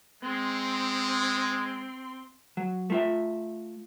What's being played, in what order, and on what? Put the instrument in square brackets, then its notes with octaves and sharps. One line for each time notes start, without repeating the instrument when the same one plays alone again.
[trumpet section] G#3 [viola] C4 C6
[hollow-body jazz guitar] F#3
A3 F4 E5